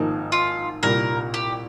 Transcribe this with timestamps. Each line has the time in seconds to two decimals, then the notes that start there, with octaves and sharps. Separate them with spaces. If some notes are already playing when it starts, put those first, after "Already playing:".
Already playing: G#1 G#2 F3 A#3 D#4
0.32 F4
0.83 C2 A#2 G3 A#3 A#4
1.34 G4